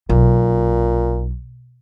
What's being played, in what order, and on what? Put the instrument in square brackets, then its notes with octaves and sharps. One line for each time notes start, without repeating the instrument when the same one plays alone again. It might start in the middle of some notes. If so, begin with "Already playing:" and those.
[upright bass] B1 [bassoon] A#2